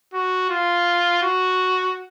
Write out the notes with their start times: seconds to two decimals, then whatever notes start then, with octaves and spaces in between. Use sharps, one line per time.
0.14 F#4
0.50 F4
1.22 F#4